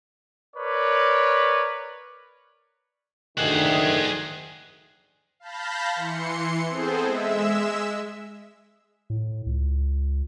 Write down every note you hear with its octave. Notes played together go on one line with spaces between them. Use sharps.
A#4 B4 C#5 D5
D2 D#3 G#4 F#5
F5 A5 B5 G6 A#6
E3 C6 C#7
B3 C4 G#4 A4 C5
G#3 E5 E6
A2
C#2